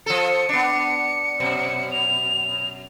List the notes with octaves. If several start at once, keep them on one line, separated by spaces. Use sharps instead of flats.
F3 A4 C#7
B3 D4
F#2 B2
F7